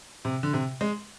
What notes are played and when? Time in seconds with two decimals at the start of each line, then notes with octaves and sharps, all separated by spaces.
0.25 C3
0.43 D3
0.53 C3
0.81 G#3